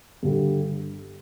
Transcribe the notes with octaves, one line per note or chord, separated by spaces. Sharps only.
G2 D3 G3